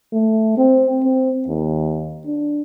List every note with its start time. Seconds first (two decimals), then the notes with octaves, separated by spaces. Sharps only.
0.13 A3
0.58 C4
1.04 C4
1.48 D#2
2.26 D4